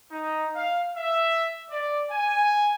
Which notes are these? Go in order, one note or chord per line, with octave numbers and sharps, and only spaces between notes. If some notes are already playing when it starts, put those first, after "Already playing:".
D#4
F5
E5
D5
G#5